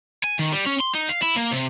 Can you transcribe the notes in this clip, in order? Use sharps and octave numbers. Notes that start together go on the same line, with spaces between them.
G#5
D#3
G3
C#4
C6
D#4
F5
E4
A#3
C3